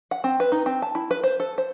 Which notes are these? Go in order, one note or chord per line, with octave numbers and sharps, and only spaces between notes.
F#5
C4
B4
D#4
C4
A5
E4
B4
C5
A4
C5